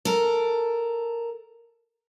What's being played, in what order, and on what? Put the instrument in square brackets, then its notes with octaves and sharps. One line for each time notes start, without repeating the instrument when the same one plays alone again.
[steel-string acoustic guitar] A4 A#4